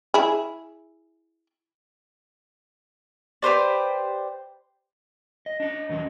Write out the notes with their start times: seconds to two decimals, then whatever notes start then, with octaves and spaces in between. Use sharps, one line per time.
0.14 E4 G#4
3.42 G4 B4 C5 D5
5.46 D#5
5.60 D4 D#5
5.89 E2 D#3 F#3 C#4 D#5